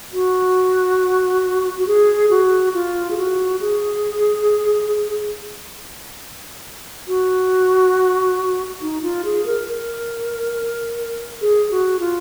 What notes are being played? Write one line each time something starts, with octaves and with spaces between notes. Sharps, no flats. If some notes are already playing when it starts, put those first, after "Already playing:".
F#4
F#4
G#4
F#4
F4
G#4
F#4
G#4
F#4
D#4
F4
G#4
A#4
A#4
G#4
F#4
F4